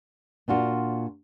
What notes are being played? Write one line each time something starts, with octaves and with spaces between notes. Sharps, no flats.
A#2 D4 F4 F#4